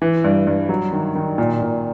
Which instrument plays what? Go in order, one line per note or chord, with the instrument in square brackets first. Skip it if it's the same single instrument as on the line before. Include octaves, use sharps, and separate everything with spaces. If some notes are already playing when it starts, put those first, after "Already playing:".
[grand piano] E3
G2
G2
F#3
D#3
D#3
A#2
A#2